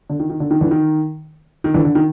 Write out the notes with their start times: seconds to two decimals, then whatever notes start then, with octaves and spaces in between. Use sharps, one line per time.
0.10 D3
0.20 D#3
0.30 D#3
0.40 D3
0.51 D#3
0.61 D3 E3
0.71 D#3
1.64 D#3
1.74 D3 E3
1.85 D3
1.95 D#3